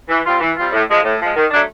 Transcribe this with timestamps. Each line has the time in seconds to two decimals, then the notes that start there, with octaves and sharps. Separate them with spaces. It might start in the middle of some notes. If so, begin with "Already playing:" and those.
0.09 E3
0.25 G3 C4 F4
0.40 E3
0.56 G3 C4 F4
0.71 A2
0.88 F3 G#3
1.03 A2
1.19 F3 G#3
1.34 D#3
1.51 F#3 A3 D4